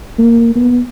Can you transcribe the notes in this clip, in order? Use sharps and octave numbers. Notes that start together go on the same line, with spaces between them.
A#3
B3